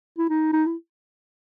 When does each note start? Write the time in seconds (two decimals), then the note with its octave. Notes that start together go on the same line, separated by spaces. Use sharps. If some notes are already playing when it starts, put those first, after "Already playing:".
0.18 E4
0.29 D#4
0.53 D#4
0.66 E4